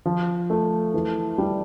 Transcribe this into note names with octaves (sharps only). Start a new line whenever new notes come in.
F3
A3
E3
G3